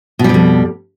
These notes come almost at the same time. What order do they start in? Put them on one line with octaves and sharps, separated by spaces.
B2 G3 G#2 F2